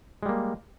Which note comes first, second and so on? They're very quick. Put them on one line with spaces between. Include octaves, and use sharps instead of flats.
G#3 G3 A#3